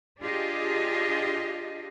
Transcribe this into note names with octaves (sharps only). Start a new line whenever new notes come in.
D4 F4 G4 G#4 D#5